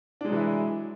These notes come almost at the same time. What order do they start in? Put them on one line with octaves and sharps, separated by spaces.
D4 G#3 F#3 E3 E4